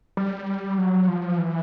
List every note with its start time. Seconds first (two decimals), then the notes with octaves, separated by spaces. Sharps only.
0.17 G3
0.78 F#3
1.08 F3
1.38 E3